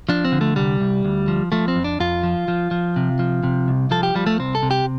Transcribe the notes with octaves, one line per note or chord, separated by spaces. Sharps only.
F3 D4
C4
D3
A3
C2 G3
C2
D2
F3
F3 A3
C4
F2
D4
F2 F4
F3
F3
F3
C3
F3
C3
C2
F3 A4
G4
F3 G3
A3
C2 C4
A4
C3
G4